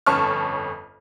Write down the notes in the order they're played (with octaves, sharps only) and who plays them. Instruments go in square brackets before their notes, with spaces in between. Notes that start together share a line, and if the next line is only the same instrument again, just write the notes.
[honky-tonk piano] G1 F2 C#4 A5 C#6 F6